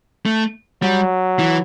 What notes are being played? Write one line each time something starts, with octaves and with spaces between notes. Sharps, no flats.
A3
F#3 G3
E3